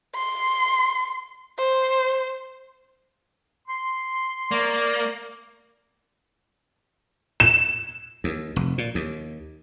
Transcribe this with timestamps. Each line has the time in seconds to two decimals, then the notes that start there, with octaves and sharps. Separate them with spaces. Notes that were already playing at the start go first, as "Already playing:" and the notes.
0.15 C6
1.59 C5
3.68 C6
4.51 A#3 D5
7.40 E7
8.24 D#2
8.56 F1
8.78 A#2
8.95 D#2